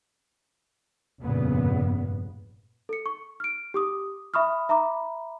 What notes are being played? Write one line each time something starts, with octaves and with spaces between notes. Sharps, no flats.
F1 G2 A#2 C#3 B3
A4 C#7
C#6
F6 D7
G4 D6 D#6
E5 B5 C#6 D#6 F6
E5 A#5 B5 D6